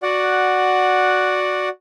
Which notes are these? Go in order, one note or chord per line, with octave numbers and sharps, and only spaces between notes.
F#4 D5 F#5